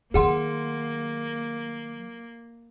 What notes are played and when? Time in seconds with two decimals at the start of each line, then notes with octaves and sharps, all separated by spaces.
0.14 D#3 F#3 A#3 G#4 F#5 C6